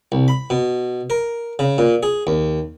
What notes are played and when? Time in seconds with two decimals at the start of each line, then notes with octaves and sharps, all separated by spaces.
0.12 C2
0.28 B5
0.50 B2
1.10 A#4
1.59 C#3
1.78 A#2
2.03 G#4
2.27 D#2